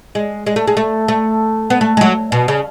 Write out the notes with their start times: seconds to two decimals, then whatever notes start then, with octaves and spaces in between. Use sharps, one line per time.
0.15 G#3
0.46 G#3
0.56 A3
0.67 G#3
0.77 A3
1.08 A3
1.70 B3
1.81 A3
1.97 G#3
2.01 F#3
2.32 B2
2.48 C#3